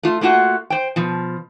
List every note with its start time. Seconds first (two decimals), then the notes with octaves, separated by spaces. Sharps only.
0.03 A3 F4
0.21 A3 A#3 F4 F#4 F#5
0.70 C5 G5
0.96 B2 F3